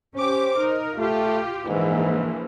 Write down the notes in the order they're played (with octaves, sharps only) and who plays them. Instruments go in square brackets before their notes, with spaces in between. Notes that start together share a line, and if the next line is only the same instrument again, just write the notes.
[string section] C#4 G4 D6 [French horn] C5
[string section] D#4 A#4
[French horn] A3 [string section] F4 G4
[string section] A#1 E3 [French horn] G#2